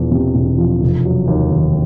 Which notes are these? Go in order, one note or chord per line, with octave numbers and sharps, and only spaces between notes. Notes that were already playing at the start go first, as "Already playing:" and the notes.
Already playing: E1 E2 F3
C3
E1
F3
F1
F#3
D#2
D#3